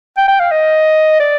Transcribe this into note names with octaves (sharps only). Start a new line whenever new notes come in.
G5
G5
F5
D#5
D5